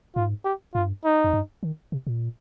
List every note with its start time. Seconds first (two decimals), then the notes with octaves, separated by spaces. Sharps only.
0.16 G#2 F4
0.45 G4
0.74 G2 F4
1.05 D#4
1.24 F2
1.33 G2
1.63 D#3
1.92 C3
2.07 A#2